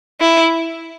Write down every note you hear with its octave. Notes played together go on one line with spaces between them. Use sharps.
E4